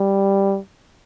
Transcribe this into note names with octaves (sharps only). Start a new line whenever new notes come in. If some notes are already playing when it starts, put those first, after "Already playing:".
Already playing: G3